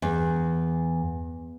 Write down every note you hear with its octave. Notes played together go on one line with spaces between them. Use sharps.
E2